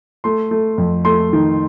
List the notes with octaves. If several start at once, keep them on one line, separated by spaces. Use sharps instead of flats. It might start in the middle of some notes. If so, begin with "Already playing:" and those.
A3 C6
A3
F2
A3 C6
D#3